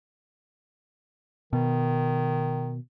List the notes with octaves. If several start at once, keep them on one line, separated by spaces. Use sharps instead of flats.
B2 D#3